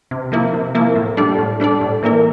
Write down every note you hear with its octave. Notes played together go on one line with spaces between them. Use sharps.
C3
F3 A#3 E4
C3
F3 A#3 E4
A2
G3 D4 A4 D5
A2
G3 D4 A4 D5
A2
E3 A#3 E4 A#4